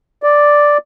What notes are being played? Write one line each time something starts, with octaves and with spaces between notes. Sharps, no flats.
D5